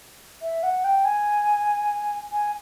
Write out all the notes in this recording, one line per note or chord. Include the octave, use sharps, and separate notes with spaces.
E5
F#5
G5
G#5
G#5